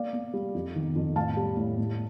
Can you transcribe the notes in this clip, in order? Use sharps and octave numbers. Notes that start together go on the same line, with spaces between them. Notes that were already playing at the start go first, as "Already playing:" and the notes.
Already playing: A#3 D5 F5
A#3
G3
F2
D#3
F2
A2 F5 A5
G3
A2
A2